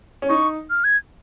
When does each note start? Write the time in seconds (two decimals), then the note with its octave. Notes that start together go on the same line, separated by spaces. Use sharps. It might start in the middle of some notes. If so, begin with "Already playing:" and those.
0.22 C#4
0.29 D#4 C#6
0.70 F6
0.84 G#6